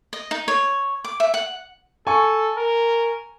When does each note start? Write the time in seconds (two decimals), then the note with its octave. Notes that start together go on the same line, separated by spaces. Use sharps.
0.13 D#5
0.31 D#4
0.48 C#5
1.05 D6
1.20 E5
1.34 F#5
2.07 A4 G#5 C#6
2.57 A#4